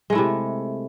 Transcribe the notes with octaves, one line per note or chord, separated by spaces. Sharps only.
C3 G#3 A3 E4